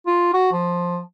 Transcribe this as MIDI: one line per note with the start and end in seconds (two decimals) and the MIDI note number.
0.07 0.29 65
0.34 0.50 66
0.52 1.00 53